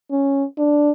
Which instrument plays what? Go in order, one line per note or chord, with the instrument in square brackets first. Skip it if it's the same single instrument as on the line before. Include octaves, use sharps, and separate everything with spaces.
[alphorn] C#4
D4